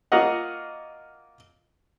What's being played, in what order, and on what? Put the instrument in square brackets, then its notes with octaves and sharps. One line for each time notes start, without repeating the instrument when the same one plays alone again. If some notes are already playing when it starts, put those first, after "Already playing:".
[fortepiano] A#3 F4 F#4 A#4 D#5 F#5